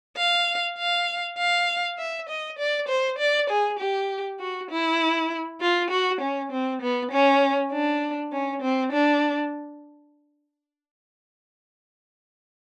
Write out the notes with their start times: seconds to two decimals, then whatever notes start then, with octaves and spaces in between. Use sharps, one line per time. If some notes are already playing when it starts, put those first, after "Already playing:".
0.17 F5
0.78 F5
1.38 F5
1.98 E5
2.29 D#5
2.59 D5
2.88 C5
3.18 D5
3.50 G#4
3.79 G4
4.40 F#4
4.71 E4
5.61 F4
5.90 F#4
6.21 C#4
6.52 C4
6.82 B3
7.11 C#4
7.72 D4
8.32 C#4
8.62 C4
8.92 D4